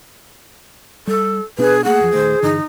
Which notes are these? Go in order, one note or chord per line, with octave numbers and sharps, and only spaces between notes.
G3 A4
B2 B3 D4 G#4 B4
A3 A#3 D4 G#4 F#5
E2 F3
D#1 D#3 A3 C5
G2 D3 E3 D#4